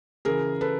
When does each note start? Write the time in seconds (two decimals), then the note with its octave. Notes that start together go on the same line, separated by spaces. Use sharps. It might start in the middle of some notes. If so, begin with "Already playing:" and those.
0.25 C#3 E3 G#4 A#4
0.61 A4 B4